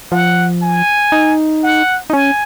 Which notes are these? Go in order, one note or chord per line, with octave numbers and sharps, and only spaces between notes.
F3 F#5
G#5
D#4
F#5
D#4
C#4 G#5